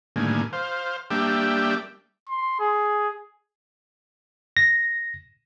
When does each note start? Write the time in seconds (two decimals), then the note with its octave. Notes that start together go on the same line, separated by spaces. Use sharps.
0.16 A2 D3 D#3 G3 A#3 G#5
0.53 C5 F5
1.10 G3 A#3 D4 G4 E5 G5
2.29 C6
2.59 G#4
4.57 A#6